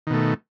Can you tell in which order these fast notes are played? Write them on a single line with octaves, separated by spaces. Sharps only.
D#3 B2 A3